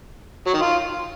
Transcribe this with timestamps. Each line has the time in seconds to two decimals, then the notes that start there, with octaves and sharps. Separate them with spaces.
0.47 F#3
0.54 D#3
0.61 F4